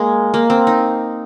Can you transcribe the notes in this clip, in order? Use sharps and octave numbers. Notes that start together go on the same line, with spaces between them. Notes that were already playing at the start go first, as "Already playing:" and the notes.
Already playing: G#3 A#3
A#3
C4
D#4